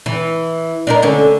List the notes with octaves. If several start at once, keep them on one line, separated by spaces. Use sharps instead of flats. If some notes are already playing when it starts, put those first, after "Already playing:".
E3
D4 D#4 A#4
D3 C#4